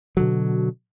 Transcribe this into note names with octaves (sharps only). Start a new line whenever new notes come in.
B2 D3 F#3